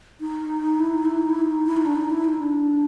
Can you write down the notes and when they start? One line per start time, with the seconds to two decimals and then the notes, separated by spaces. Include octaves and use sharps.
0.20 D#4
0.80 E4
0.94 D#4
1.05 E4
1.18 D#4
1.30 E4
1.42 D#4
1.66 E4
1.77 D#4
1.85 D4
1.95 D#4
2.10 E4
2.24 D#4
2.39 D4